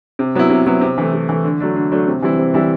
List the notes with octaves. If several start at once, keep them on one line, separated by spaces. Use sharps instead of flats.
C3
F#3 B3 E4
C3
F#3 B3 E4
C3
E3 A3
C3
E3 A3
D3
F#3 A3 D4
D3
F#3 A3 D4
C3
E3 G3 C4 E4
C3
E3 G3 C4 E4